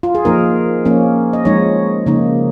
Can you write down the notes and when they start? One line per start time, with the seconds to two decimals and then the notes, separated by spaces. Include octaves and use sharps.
0.03 F4
0.15 G#4
0.25 F3 A#3 D#4 A#4
0.85 F3 A#3 C#4
1.33 D#5
1.45 F3 G#3 D#4 C#5
2.06 C#3 F3 A#3 D#4